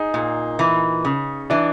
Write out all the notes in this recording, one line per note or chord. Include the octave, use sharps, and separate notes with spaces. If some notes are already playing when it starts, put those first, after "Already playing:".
Already playing: D#4 G#4
A#2
E3
C#3
E3 D4